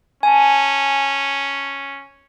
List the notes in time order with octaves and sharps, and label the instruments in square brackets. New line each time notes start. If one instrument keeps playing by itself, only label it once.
[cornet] C#4 [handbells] G#5 A5